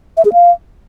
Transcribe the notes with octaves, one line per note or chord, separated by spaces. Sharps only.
E5
G#4
F5